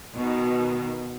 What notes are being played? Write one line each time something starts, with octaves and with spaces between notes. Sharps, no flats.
B2 D#3